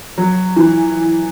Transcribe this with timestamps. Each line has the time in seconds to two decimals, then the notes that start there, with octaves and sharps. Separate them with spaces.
0.18 F#3
0.56 E3